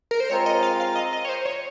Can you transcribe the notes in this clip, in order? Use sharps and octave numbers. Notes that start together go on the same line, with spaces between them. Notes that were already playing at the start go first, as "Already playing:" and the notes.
A#4
C5
G#3 C4 F4 A#4 C#5
D#5
F5
F5
D#5
D#5
C#5
C5
C#5